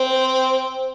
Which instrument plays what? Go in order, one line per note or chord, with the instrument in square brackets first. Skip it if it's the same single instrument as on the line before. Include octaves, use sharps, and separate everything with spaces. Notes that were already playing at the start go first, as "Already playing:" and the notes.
Already playing: [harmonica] C4